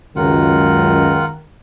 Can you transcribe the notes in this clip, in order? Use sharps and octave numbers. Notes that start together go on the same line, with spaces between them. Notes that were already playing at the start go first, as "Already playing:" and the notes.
C#2 F#2 D#3 F4 F#5